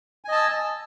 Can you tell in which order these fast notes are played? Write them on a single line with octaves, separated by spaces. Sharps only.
G#5 D#5 A5 E6